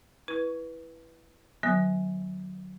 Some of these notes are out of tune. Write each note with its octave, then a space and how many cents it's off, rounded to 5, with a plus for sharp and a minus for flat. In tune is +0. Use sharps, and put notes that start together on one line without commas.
E4 +0 B4 -10 C#6 +0
D3 +45 F#3 +0 B3 -45